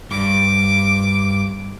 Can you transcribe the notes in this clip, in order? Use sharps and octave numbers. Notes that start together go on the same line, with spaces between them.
G2 D6